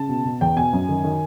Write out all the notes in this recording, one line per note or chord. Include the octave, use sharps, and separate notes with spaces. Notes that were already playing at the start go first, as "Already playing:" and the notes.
Already playing: C#3 A5
B2
B2
E2 G5
B2 G#5
F#2
D#3
D#3